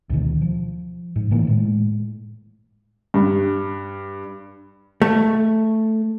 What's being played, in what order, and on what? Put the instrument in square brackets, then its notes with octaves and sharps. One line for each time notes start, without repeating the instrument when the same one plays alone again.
[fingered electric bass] D2 B2 D#3
F3
G#2
A2 D#3 E3 A#3
A2 G#3
[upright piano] G2
[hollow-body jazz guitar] A3